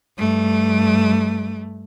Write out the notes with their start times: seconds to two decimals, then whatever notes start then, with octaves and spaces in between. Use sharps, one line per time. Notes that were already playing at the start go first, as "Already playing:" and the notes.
0.18 G2 A3